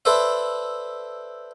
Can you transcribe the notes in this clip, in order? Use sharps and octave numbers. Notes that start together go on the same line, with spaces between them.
A4 B4 C5 D5 E5